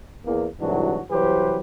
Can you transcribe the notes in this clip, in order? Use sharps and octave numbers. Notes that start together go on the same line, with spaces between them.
E2 A#3
C2 G#2 E3 F#3 D4 F#4
C2 E3 F#3 G4 B4 C5